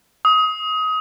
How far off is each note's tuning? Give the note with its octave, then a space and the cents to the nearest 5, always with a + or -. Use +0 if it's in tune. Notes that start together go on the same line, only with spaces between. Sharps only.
D#6 +25